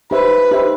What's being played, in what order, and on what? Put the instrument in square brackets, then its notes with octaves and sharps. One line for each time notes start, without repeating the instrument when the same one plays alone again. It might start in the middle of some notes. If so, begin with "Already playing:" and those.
[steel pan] D#4 G4 C5 E5 [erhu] B4
[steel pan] D#4 G4 C5 E5